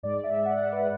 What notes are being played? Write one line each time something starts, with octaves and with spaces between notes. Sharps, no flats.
G#2 G#3 D5
E5
E5
F#5
E5
F#5
B4